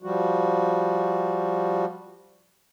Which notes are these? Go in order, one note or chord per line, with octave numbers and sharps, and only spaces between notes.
F3 G3 F#4